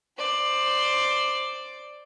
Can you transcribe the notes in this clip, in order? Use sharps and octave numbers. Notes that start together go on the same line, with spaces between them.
C5 D5